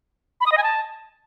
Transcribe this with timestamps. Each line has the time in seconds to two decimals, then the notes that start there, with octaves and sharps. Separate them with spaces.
0.41 B5
0.46 D#6
0.52 D#5
0.57 G#5
0.63 A5